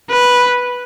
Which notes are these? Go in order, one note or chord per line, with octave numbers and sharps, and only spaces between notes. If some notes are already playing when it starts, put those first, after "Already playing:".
B4